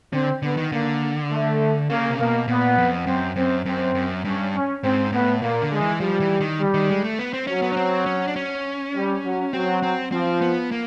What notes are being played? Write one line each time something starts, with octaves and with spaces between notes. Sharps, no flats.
D3 C4
D3 B3
D#3
D3 A#3
A3
C#3 A#3
C3
B2 A#3
A#2 B3
F2
F#2 C4
F#2 C4
F#2 C4
F#2
G2 C#4
C#4
G#2 C4
A2 B3
A#2 A#3
D3
G#3
E3
F3 G3
E3
D#3
G3
D#3
G#3
A3
B3
C4
F#3 C#4
B3
C#4
C4
C#4
D4
C#4
G3
F#3
F#3 C4
C4
F3 C4
B3
A#3